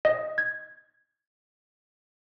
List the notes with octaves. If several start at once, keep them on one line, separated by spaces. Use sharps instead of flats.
D#5
G#6